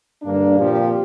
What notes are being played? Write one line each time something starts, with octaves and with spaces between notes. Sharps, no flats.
G2 D3 A#3 D4
A#2 F3 C4 G4